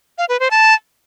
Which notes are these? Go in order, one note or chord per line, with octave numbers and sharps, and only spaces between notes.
F5
B4
C5
A5